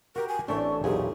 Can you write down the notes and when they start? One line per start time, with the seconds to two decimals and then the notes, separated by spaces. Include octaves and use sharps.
0.16 F#4 G4 A#4
0.28 G#5
0.48 A1 A3 C4 D4 C#6
0.84 B1 E2 A#2 G4 G#4